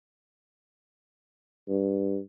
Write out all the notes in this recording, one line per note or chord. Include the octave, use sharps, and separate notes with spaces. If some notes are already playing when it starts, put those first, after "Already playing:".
G2